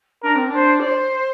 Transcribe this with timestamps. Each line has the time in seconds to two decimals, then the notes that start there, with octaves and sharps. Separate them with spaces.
0.23 D4 A#4
0.35 C4
0.48 D4
0.55 C5
0.80 D5
0.86 C5